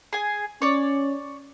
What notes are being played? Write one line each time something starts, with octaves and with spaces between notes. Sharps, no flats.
G#4 G#5
C#4 C#5 D5